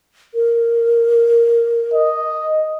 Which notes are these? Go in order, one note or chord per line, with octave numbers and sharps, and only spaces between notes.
A#4
D#5